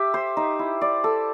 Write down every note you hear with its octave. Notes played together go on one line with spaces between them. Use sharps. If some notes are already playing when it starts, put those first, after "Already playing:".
Already playing: G4 E5
C5
D#4
E4
D5
A4